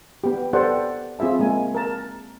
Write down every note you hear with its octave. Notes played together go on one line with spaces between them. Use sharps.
B3 G4
G4 A4 B4 C5 D5 F#5
C4 F4 G#4 E5 A5
G#3 A#3 G#5
A#4 A5